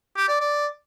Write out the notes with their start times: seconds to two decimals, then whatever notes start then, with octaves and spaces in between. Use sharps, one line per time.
0.17 G4
0.29 D5
0.40 D5